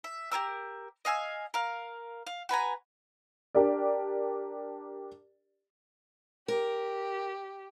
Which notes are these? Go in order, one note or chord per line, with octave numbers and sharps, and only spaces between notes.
E5
G4 G#4 A#4 E6
D#5 F5 G#5 E6
A#4 F5
F5
F#4 B4 G#5 A#5
D4 G4 A#4 D5
G4 A#4